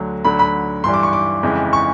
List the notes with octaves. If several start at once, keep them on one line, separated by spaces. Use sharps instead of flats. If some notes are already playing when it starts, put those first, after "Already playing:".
Already playing: D2 D3 F#3
D2 D3 F#3 B5
B5
G2 E3 G3 C6
D6
C#6
D6
F2 C#3 E3 G#3
C#6